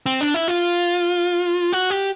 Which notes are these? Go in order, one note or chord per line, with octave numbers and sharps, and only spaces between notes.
C4
D4
E4
F4
F#4
G4